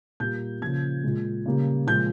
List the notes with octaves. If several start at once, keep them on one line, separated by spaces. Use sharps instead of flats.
A#2 G3 A#3 G6
C#3 F3 A#3 G#6
A#2 G#3
C#3 G3 A#3
A#2 F3 G#3 G6